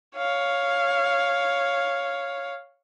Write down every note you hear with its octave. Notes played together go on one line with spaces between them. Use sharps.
C#5 F5